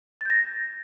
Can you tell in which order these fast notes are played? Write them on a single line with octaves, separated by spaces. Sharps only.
A6 G6 A#6